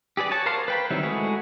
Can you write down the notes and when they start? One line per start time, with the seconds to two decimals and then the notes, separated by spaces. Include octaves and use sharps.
0.17 G4 G#4 B4 D5
0.31 F#4 C#5 A5
0.46 A#4 C5 F5 A5 C6
0.68 B4 G5 B5
0.90 D#3 F#3 G3 C4 E4
1.03 G#3 A3 E4 F#4 G#4